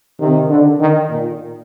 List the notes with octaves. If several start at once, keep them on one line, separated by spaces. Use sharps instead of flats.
C3 D#3
D3
D#3
A#2